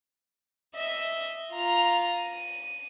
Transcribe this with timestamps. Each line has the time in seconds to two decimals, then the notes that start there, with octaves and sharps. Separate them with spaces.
0.76 D#5 E5
1.53 F4 A#5
2.18 D#7